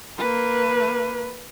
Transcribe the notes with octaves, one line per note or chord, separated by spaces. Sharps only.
A#3 B4